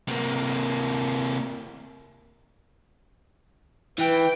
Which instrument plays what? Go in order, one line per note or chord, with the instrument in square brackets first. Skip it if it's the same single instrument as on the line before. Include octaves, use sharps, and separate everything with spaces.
[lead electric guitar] C3 A#3
[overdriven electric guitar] E3 [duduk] B4 [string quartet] G5